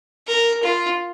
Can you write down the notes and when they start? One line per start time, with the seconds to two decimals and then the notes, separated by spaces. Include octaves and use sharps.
0.28 A#4
0.63 F4